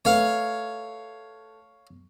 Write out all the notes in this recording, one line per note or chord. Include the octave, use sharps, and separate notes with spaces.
A3 B4 C#5 F5